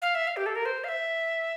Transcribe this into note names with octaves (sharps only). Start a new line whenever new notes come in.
F5
E5
F5
G4
A4
A#4
C5
F5
E5